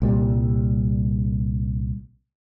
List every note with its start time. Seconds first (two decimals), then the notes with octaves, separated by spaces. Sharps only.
0.02 C2 A#2 G3